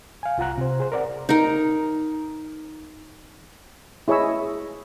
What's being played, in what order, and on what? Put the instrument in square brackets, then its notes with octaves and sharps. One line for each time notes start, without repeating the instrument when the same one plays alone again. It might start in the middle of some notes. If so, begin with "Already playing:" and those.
[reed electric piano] F5 G#5
C2 F4 F#5 A#5 F#6
C3 C5
G#4 C5
A#4 D5 F#5
[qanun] D#4 A#4
[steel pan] E4 G#4 C#5 D#5 B5 E6